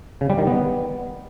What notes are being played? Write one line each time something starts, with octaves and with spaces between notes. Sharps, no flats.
C#3
G3
D#3
B3